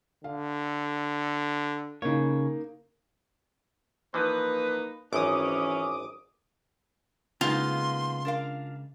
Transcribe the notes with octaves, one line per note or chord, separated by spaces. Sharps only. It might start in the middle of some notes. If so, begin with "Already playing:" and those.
D3 F5
C#3 A#3 D#4 C#5
E3 F3 A#3 D#4 B4
G#1 F#2 E3 C#4 D6 D#6
C#3 G#3 A#3 B3 D#4 F4 C6
D4 A#4 F5